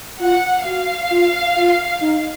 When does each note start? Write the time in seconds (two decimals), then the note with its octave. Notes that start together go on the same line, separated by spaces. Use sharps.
0.20 F4 F#5
0.65 F#4 F5
1.11 F4
1.57 F4
2.02 D#4